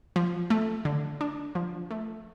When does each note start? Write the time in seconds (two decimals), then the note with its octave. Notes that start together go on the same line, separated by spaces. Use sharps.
0.16 F3
0.50 A3
0.85 D3
1.21 D4
1.55 F3
1.91 A3